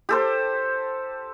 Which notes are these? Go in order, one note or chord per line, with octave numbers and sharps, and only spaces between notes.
G4 A4 C5